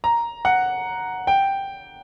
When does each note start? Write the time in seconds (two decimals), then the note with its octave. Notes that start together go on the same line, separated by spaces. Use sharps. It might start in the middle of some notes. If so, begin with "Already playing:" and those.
0.04 A#5
0.45 F#5
1.27 G5